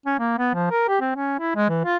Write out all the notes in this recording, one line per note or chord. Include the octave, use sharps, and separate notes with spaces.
C#4
A#3
B3
F3
A#4
G4
C4
C#4
E4
G#3
E3
F4